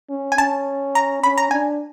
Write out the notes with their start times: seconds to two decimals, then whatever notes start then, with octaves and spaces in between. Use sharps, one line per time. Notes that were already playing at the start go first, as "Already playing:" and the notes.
0.10 C#4
0.32 G#5
0.38 C#4 A5
0.95 A#5
1.23 C#4 B5
1.38 A#5
1.51 D4 G#5